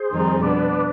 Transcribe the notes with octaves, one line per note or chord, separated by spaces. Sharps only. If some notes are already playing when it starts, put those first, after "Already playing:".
Already playing: G#4 C5
F2 D#3 G3 C4 D#4
B2 B3 D4 B4 D5